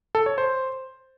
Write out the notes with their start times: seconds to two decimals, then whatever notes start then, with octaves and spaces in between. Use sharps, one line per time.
0.15 A4
0.26 C#5
0.38 C5